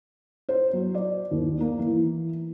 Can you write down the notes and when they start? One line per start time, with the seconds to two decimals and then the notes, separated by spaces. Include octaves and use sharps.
0.49 C5
0.73 F#3
0.94 D5
1.31 D#2
1.61 A#3
1.79 E3